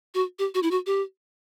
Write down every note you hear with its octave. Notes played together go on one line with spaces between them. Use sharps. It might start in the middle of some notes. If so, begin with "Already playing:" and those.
F#4
G4
F#4
E4
F#4
G4